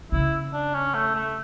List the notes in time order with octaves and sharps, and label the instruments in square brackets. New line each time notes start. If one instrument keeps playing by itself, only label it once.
[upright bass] C#3 [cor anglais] E4
[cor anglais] D4
C#4
A3
A3